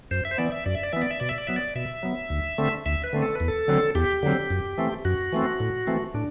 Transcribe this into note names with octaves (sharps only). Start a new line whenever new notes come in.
F#2 C5
E5
C5
E3 B3 D5
E5
F#2 D5
E5
D5
E3 B3 E5
D5
E5
B2 D5
E5
D5
F#3 B3 E5
D5
B2 E5
F#3 B3
D2
D3 A3 C4
D2 E5
B4
D3 A3 C4
A4
E2 B4
A4
D3 F#3 C4
E2 G4
D3 F#3 C4
F#2
E3 A3 C4
F#2 F#4
E3 A3 C4
A2
E3 A3 C4
A2 D4